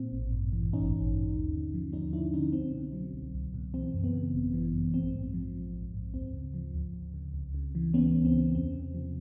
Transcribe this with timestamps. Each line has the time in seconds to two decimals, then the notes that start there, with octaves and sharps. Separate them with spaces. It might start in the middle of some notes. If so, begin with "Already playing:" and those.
Already playing: A#2 C4
0.12 A1
0.32 G2
0.53 E3
0.73 A1 C#4 D#4
0.93 A1
1.13 G2
1.34 D#2
1.53 D3
1.74 F3
1.93 D#2 C#4 D#4
2.13 D#2 D4 E4
2.34 D3 C#4 D#4
2.53 C2 C4
2.73 B2
2.93 F#3
3.13 C2
3.34 C2
3.54 B2
3.74 E3 C4
3.94 F#2
4.04 B3
4.13 C#3
4.33 G#1
4.54 E3
4.73 F#2
4.94 A#1 C4
5.14 G#2
5.34 F3
5.54 A#1
5.74 A#1
5.94 G#2
6.14 D2 C4
6.34 C#3
6.54 F3
6.74 D2
6.94 D2
7.14 C#3
7.34 C#2
7.54 C#3
7.75 E3
7.94 C#2 B3 C#4
8.14 C#2
8.25 C4
8.35 C#3
8.55 E2 C4
8.74 C3
8.94 F3